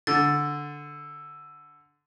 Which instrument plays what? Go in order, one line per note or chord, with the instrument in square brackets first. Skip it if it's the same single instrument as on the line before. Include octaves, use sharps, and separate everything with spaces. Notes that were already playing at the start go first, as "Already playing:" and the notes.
[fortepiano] D3 [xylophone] A6